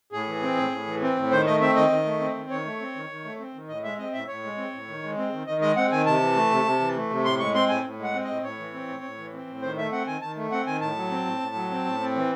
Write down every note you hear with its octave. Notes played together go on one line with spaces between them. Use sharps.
A2 G#4
E3
C4
A2
A2
E3
C4
A2
D#3 C5
A3 D#5
C4 E5
D#3 D#5
D#3
A3
C4
D#3
D#3 C#5
A3
C4
D#3
D#3
A3
C4
D#3
A2 D#5
G#3 E5
C4 D#5
A2 E5
A2 C#5
G#3
C4
A2
D#3
G#3
C4
D#3
D#3 D#5
G#3 D#5
C4 F#5
D#3 G#5
C3 A5
E3
A3
C3
C3
E3
A3
C3
A2 C6
G#3 C#6
C4 C6
A2 G#5
A2
G#3 F#5
C4
A2 D#5
A2 C#5
E3
C4
A2
A2
E3
C4
A2
D#3 C5
A3 E5
C4 F#5
D#3 G#5
D#3 A5
A3
C4 F#5
D#3 G#5
A2 A5
F#3
C4
A2
A2
F#3
C4
A2
C4
E3